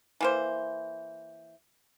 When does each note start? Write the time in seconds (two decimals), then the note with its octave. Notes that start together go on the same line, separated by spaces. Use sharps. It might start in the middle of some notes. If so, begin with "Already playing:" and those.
0.21 E3 A#3 C5